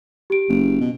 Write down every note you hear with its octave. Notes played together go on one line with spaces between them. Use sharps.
G4 D7
F#1
B2